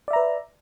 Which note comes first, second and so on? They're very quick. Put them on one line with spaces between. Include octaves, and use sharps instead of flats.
D5 E5 A#5 B4